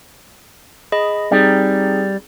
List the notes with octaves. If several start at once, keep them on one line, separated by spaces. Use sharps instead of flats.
G#4 D#5 B5
G3 C4 D#4 G#4